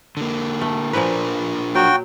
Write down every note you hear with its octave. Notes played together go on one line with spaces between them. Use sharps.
D3 A#3
A3
A#2 F3 D4 F4 A#4 B4
F#3 F#4 G5